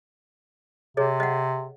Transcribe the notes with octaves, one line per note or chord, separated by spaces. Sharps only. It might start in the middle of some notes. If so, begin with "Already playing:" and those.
C3 G#4 C#5 D#5
D#5 F5 F#5